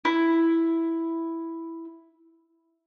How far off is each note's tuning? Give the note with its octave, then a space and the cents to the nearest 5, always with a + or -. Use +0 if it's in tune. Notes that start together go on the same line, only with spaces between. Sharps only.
E4 +0